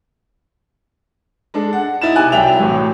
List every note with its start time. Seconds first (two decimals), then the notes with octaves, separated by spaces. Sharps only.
1.54 G#3 D4 A4
1.73 F#5
2.01 D#4 E4 A6 E7
2.16 C3 G#5 F#6
2.32 C2 F#3 E5 G5 F7
2.59 A2 C3 E3 F#3